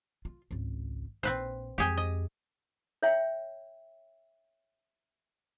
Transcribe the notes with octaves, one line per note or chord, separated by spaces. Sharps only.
F4
G#1 C#2
A#1 C4 B4 C5
F2 G#3 G4 G#4 G5
D#5
C#5 E5 G5